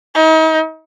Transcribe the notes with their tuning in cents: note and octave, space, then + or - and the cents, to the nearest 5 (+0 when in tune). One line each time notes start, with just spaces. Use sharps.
D#4 +40